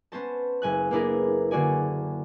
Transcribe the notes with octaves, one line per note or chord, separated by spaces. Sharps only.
B3 C#4 C5 A5
F#1 G#5 F#6
A#3 B3 D4 E4 G#4 A#4
D3 A#3 F#4 D5 G#5